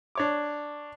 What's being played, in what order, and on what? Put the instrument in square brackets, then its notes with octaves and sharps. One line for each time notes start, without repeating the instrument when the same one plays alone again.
[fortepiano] D4 C#5 D6